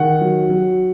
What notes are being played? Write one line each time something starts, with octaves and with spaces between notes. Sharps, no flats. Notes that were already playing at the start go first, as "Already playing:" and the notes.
Already playing: D#3 F#5
F#3
F#3